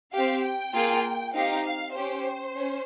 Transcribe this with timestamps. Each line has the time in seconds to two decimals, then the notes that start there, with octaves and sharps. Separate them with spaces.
0.13 C4 G4 F5
0.44 G5
0.73 A#3 F4 G#4
1.34 C4 D#4 G4 F5
1.65 F5
1.94 C#4 G4 C5
2.55 C#4